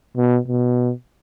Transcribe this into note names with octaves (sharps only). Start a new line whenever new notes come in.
B2
B2